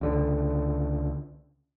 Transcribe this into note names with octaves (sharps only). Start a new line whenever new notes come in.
C#2 D3